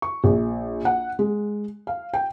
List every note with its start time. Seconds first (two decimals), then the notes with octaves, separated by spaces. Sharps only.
0.02 C#6
0.24 A#1
0.85 F#5
1.19 G#3
1.87 F5
2.14 G5